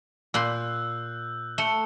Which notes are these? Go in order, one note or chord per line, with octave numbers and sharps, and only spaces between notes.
A#2 B5 C6 E6 F#6 G6
A3 C#7 G7